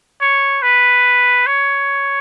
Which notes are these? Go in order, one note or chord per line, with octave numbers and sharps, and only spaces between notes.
C#5
B4
C#5